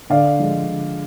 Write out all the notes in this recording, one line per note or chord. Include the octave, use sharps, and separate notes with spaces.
D3 D5 F5
F3 G#3
D3